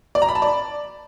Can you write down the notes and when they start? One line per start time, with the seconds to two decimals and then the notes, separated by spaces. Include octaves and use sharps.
0.15 D5
0.22 A#5
0.29 B5
0.35 A5
0.42 D5